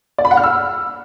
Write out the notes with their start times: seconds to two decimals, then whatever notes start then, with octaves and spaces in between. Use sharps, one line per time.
0.18 D5
0.25 B5
0.31 F#5
0.37 F6
0.43 E6